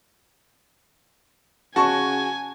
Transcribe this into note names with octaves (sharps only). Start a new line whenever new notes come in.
C#3 F#4 G#5 A5 C#6